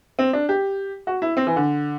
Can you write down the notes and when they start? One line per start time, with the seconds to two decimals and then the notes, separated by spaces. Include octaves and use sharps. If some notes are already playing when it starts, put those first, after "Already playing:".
0.19 C4
0.33 D4
0.49 G4
1.07 F#4
1.22 E4
1.37 C4
1.47 E3
1.56 D3